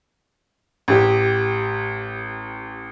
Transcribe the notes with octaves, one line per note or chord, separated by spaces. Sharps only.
A1 G4